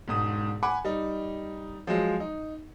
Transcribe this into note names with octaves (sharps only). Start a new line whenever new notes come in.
E1 G#2 D#6
F#5 G#5 B5 D6
G3 D#4
F3 F#3 G#3
D#4